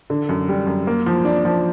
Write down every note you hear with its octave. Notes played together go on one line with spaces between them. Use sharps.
D3
F#2
G3
F#2
A#3
F3
D4
F3